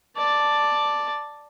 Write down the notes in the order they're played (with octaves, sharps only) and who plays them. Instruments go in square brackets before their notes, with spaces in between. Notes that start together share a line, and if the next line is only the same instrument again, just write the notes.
[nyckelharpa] D5 A5